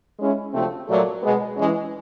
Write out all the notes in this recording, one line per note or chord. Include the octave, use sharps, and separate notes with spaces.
G#3 C#4 E4
D2 C3 F3 A3 C4
A#2 F#3 A3
B2 G#3 B3
E3 G#3 C#4